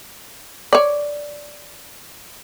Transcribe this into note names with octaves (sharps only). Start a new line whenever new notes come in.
C#5 D5